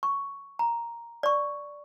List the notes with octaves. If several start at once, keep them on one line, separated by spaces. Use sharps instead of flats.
C#6
A#5
D5 C#6